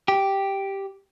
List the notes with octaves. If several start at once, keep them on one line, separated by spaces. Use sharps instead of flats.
G4